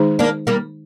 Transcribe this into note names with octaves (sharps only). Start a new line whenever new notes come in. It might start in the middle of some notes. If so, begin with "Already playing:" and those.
Already playing: D#3 G#3 D#4 G#4
A#3 D4
G3 A#3